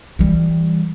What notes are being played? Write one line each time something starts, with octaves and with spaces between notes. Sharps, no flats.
E3 G3